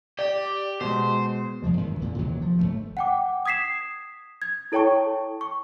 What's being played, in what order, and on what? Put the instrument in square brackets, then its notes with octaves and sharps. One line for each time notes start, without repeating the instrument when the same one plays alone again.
[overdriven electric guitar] G4 [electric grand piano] D5
[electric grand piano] B2 G#3 [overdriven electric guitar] C5
[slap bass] E2 C3 F3 G#3
F#2 D#3 E3
E2 A#2 D3
D#2 C3 E3 F#3
F3
G1 F2 A3
[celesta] F#5 G5 D6
D#6 G#6 B6 C7 E7
G#6
E4 A4 C#5 G5 A5 C#6
C#6